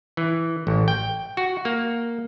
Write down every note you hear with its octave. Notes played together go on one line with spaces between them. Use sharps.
E3
A1
G5
F#4
A#3